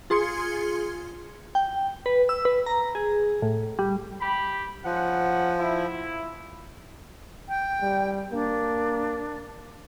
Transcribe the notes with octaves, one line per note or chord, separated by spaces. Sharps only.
F4 G#4 C6 G#6 C#7
G5
B4
E6
B4
A#5
G#4
A2
G3
G4 B5
G#2 F3 C#4 F#5
E4
G5
G3
A#3 D4